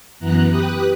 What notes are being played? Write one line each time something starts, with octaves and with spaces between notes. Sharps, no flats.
F#2 E3 B3 A#5 F#6
G4 B4 D#6 F#6